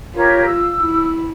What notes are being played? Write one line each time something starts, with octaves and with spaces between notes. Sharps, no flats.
F4 G4 A#4 C#5
E6
E4